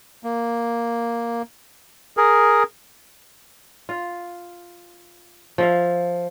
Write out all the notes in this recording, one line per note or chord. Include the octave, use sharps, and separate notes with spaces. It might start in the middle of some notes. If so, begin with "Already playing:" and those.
A#3
G#4 A#4
F4
F3 E5 F5